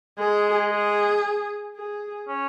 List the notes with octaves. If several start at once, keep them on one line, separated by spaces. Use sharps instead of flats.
G#3 G#4
G#4
G#4
C#4